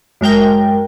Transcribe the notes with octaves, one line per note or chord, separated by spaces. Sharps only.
F#2 G#3 A#4 G5